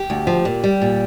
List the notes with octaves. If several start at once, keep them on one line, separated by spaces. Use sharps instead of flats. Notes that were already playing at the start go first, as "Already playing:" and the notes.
Already playing: G4
D2
F3
A#2
G3
A#2